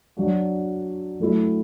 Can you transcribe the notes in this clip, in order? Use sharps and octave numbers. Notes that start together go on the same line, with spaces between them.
F#3 D4 F#4
F#3 A3 E4